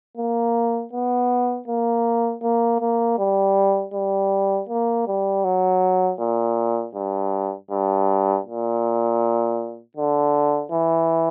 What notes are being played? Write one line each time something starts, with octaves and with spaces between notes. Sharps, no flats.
A#3
B3
A#3
A#3
A#3
G3
G3
A#3
G3
F#3
A#2
G2
G2
A#2
D3
E3